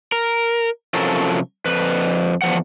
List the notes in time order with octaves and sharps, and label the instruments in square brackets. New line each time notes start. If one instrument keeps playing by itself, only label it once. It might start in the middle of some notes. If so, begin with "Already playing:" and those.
[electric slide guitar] A#4
C3 F3 F#3 C#4 A4 A#4
F2 B4
E2 F3 F#5